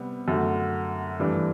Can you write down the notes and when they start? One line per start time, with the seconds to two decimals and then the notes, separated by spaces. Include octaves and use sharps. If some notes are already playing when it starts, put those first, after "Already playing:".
Already playing: C3 G3 B3
0.28 F#2 D3 A3
1.20 G2 E3 A3 D4